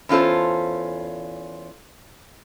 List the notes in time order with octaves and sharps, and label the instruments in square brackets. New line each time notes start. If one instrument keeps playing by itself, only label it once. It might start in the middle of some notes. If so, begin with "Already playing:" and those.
[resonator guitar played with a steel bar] E2 C#4 F4 A4 C5